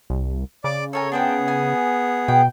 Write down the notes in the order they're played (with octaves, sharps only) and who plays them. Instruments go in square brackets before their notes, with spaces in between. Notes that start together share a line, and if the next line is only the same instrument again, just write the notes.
[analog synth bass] C2
[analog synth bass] C#3 [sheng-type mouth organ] D5 D6
[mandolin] A4 A#4 G#5 [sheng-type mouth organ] C#5
[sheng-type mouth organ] B3 G#4 [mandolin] D4 C5 G5
[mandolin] G#5
[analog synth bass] B2 [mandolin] G5